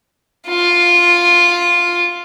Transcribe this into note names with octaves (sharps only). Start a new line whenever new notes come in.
F4